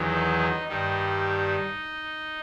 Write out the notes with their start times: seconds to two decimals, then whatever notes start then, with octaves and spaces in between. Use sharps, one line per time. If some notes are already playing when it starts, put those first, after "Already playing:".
Already playing: E2 D#3 F#3
0.14 D#4
0.68 G2 D#3 G3 D#4